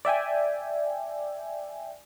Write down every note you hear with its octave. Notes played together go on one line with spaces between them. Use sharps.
D5 E5 G5 G#5